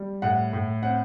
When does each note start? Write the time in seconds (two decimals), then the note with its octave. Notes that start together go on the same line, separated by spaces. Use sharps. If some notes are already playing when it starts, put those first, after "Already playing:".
Already playing: G3
0.22 A2 F#5
0.53 A2
0.83 C4 F#5